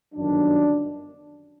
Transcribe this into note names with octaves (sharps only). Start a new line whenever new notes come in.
G1 F#2 D#3 F#3 D4